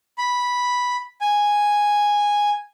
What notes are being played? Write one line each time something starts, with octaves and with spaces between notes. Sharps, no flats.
B5
G#5